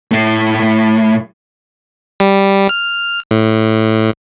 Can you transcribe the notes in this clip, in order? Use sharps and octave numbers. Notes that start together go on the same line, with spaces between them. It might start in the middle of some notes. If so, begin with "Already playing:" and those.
A2 A3
G3
F6
A2